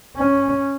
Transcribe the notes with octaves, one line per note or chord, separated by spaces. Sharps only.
C#4